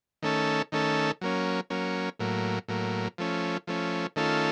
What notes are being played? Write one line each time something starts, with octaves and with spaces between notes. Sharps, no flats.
D#3 A3 C#4 A4
D#3 A3 C#4 A4
F#3 A#3 C#4
F#3 A#3 C#4
A2 F#3 A#3
A2 F#3 A#3
F3 A3 C#4
F3 A3 C#4
D#3 A3 C#4 F4 A4